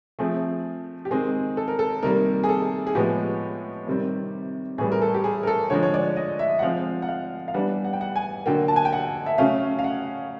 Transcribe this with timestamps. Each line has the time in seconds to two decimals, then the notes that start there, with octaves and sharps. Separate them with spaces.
0.19 F3 A3 C4 G#4
1.05 G4
1.11 D#3 G#3 C4 G#4
1.57 A4
1.68 A#4
1.79 A4
2.03 C3 D#3 G3 A#3 A#4
2.44 G#4
2.49 A4
2.87 G#4
2.95 A2 F3 G#3 B3 G4
3.87 C3 D#3 G3 C4
4.78 A2 E3 G3 G#4
4.92 A#4
5.02 A4
5.14 G4
5.24 G#4
5.43 A#4
5.47 A4
5.70 D3 F3 G#3 C#5
5.83 C#5
5.94 D5
6.16 D#5
6.39 E5
6.59 F#5
6.62 F3 G#3 C4 F5
7.02 F#5
7.09 F5
7.48 F5
7.54 E3 G3 B3 D4 F#5
7.84 F#5
7.93 G5
8.01 F#5
8.16 G#5
8.46 D3 F#3 A#3 G5
8.68 A5
8.76 G#5
8.85 G5
8.93 F#5
9.26 E5
9.38 C#3 F#3 A3 C#4 F5
9.79 F5
9.84 F#5